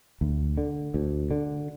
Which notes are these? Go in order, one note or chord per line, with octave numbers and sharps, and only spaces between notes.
D2
D3
D2
D3